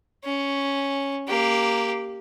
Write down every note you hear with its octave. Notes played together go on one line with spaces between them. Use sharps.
C#4
A#3 G4